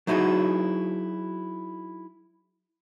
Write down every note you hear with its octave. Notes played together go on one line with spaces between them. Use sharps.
F#3 D#4 E4 F#4 G#4